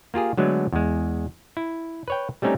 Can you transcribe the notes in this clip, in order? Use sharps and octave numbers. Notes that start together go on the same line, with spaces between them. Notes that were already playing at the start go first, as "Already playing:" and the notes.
A#3 F4 G4 G#4
D3 F#3 G#3 A3 B3
E2 G#3
E4
B4 C#5 G5
G3 A3 C4 C#4 D#4 G4